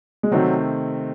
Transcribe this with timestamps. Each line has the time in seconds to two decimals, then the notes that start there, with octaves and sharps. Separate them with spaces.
0.23 G#3
0.32 C3 D#3 F#3 A3 C4